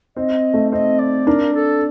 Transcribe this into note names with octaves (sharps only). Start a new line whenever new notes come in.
C4 D#5
A3
C4 D#5
D5
D4 A#4
A4